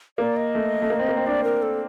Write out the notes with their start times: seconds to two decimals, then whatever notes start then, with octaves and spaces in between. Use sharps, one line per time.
0.18 A#3 D5
0.36 D#5
0.55 A3
0.82 A3
0.90 A#3
0.99 C4
1.08 A#3
1.17 C4
1.26 D4 D5
1.44 A#4
1.62 A4